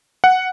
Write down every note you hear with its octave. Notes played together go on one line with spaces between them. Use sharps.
F#5